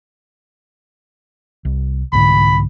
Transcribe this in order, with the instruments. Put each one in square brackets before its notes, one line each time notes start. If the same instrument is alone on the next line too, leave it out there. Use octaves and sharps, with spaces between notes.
[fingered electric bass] C2
[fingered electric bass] C2 G#2 D3 [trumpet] B5